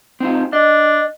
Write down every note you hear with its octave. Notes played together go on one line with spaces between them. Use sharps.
C4 D#4 F4
D4 D#5